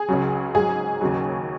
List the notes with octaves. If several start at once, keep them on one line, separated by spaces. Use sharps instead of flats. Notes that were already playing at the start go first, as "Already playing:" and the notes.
Already playing: G#4
C#2 C#3 F#3
G#2 F#3 G#4
D#2 C#3 F#3